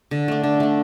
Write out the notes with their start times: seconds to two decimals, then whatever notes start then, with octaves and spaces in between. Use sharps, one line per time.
0.11 D3
0.28 A3 D4
0.44 D3
0.60 A3 D4